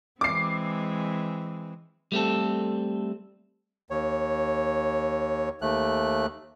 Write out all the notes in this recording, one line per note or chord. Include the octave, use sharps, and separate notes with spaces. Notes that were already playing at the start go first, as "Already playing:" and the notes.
E3 G#3 C4 D6 C7
G3 A3 C4 A4
D#2 C#5
D#2 A3 F#6